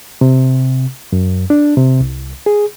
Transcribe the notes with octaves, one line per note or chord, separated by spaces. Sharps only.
C3
F#2
D4
C3
C2
G#4